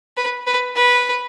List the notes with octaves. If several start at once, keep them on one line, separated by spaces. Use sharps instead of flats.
B4
B4
B4